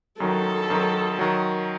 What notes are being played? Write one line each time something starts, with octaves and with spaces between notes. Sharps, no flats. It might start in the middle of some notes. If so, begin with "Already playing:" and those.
F#2 D#3 F#3 A4
F#2 D#3 F#3
D#3 F#3